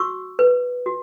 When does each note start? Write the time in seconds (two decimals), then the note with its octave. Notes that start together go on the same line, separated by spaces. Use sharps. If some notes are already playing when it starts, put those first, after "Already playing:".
Already playing: F#4 C#6 E6
0.39 B4
0.86 F#4